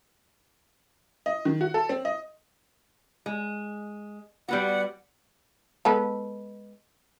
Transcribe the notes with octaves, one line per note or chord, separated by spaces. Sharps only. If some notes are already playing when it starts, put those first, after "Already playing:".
D#5
D#3
F#4
A4
C4
D#5
G#3
G3 B3 F#4 F#5
G#3 B3 A4